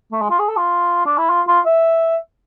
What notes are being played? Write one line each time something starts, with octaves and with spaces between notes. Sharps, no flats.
A3
G#3
F4
G#4
A4
F4
D4
E4
F4
F4
E5